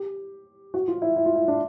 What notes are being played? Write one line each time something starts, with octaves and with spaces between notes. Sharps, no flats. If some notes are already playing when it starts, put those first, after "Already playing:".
Already playing: G4
F#4
F4
E4
E4
F4
E4
D4